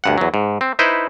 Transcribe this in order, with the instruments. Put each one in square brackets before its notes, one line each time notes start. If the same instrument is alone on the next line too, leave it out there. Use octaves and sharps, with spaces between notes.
[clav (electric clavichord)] D2 G2 F#5
E2 F#3
G#2
C4
D#4 E4 B4 C5